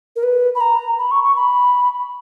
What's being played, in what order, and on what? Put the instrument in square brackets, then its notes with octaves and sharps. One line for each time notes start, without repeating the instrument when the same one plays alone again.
[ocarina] A#4
B4
B5
A#5
B5
C#6
C#6
B5